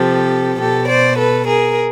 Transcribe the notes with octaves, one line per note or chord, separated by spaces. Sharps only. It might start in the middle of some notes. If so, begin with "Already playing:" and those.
Already playing: C3 F3 G4 A4
B2 G4 A4
C5 D5
A4 B4
G#4 A#4